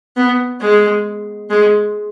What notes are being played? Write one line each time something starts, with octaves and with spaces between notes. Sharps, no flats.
B3
G#3
G#3